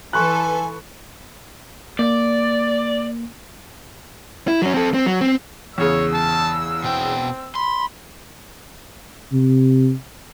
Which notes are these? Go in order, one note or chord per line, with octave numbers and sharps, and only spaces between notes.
E3 A4 B4 G#5 C6 C#6 F#6
A#3 D5
E4
F#3 C#4
C4 A4
C4
F#3
C4
E2 C#3 C#5 E6
A5
B2 C4 G5
B5 C6
C3